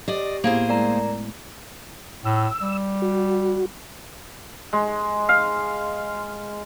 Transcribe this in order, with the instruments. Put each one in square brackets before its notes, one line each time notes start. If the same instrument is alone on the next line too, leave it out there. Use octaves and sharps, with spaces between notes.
[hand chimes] G4 [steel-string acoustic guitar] D5 D#5
[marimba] A2 B3 E4 [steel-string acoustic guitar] A#3 G#4 C5
[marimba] G#3 A3 E4 [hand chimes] A#4 D5 A#5
[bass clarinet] A2 [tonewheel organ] E6
[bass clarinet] G3
[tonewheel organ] F#4
[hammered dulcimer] G#3
F5